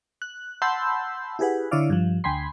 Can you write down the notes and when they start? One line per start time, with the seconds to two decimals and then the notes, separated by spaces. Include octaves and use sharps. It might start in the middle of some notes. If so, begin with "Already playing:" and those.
0.22 F#6
0.62 F#5 A5 B5 C6 E6 G6
1.39 E4 G4 G#4 B4 F#5
1.71 D3 E4 C#5 D5 F5
1.90 G2 F3
2.24 D2 G5 G#5 B5 C6